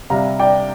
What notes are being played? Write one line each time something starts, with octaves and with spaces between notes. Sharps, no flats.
C3 G3 F5 A#5
D5 G5